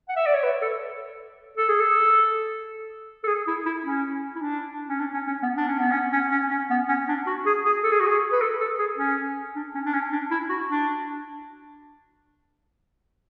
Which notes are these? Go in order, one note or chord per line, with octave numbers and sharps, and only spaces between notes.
F#5
E5
D5
C#5
B4
A4
A4
G#4
A4
A4
G#4
E4
E4
C#4
E4
D4
C#4
D4
C#4
C#4
B3
D4
C#4
B3
C#4
C#4
C#4
C#4
B3
C#4
D4
F#4
G#4
G#4
A4
G#4
F#4
G#4
B4
A4
A4
G#4
C#4
D4
C#4
D4
C#4
D4
E4
F#4
D4